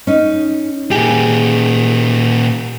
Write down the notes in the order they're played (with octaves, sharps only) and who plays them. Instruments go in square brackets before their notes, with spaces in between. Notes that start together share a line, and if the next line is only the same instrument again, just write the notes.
[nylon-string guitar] C#4 D#4
[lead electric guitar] A#2 G4 [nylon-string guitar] G#4